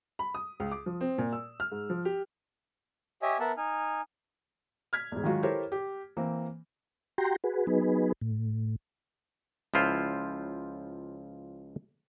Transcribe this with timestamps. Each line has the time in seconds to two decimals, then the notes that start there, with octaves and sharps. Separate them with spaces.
0.19 B5
0.35 D#6
0.60 C#2
0.72 D6
0.86 F3
1.01 C4
1.18 A#2
1.33 E6
1.60 F6
1.72 G#2
1.90 F3
2.05 G4
3.22 G4 C#5 D#5 E5 G#5
3.40 B3 A#4 E5 F#5 A5
3.57 D#4 G#5 F6
4.93 F6 G#6 B6
5.12 E2 G#2
5.24 D#3 F#3 G#3 F4 F#4
5.43 E4 G4 A4 A#4 C5 C#5
5.72 G4
6.17 E3 A#3 C4
7.18 F#4 G4 G5 A#5 C6
7.44 F#4 G#4 B4
7.67 F#3 B3 D#4 G#4 B4
8.21 A2
9.74 C#2 F3 E4 F4 C5